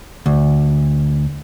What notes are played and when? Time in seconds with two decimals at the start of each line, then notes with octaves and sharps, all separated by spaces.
0.26 D2